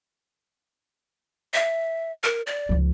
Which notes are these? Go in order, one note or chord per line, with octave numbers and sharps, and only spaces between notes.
E5
A#4
D5
C#2 F3